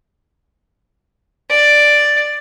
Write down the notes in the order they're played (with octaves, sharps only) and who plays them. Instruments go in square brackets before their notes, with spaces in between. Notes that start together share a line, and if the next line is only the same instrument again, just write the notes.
[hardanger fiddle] D5